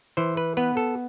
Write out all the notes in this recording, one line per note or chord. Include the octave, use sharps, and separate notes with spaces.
E3 C5
B4
B3 B4
A4